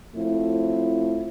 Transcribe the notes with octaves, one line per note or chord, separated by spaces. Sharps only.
A2 F3 A3 C4 E4